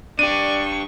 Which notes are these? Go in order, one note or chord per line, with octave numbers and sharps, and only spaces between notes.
D4 G4 D5 C#6 D#7